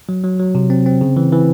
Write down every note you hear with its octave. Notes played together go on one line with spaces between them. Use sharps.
F#3
F#3
F#3
C3
C4
C4
C#3
E3
E3